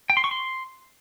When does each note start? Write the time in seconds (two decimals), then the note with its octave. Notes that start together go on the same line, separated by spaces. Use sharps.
0.10 G5
0.17 C6
0.24 C#6
0.31 C6